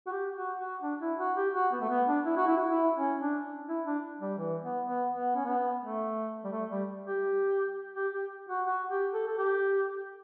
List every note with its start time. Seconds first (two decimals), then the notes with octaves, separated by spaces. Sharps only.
0.07 F#4
0.12 G4
0.36 F#4
0.59 F#4
0.82 D4
1.01 E4
1.19 F#4
1.36 G4
1.54 F#4
1.72 B3
1.81 A3
1.89 B3
2.08 D4
2.25 E4
2.36 F#4
2.47 E4
2.58 F#4
2.69 E4
2.97 C#4
3.20 D4
3.68 E4
3.86 D4
4.21 G3
4.38 E3
4.63 B3
4.87 B3
5.10 B3
5.36 C#4
5.45 B3
5.82 A3
6.45 G3
6.52 A3
6.70 G3
7.06 G4
7.95 G4
8.13 G4
8.49 F#4
8.66 F#4
8.90 G4
9.14 A4
9.27 A4
9.38 G4